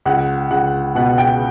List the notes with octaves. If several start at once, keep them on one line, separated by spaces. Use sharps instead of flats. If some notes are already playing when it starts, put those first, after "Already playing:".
C#2 F#5
C#2 F#5
B2 F#5
G5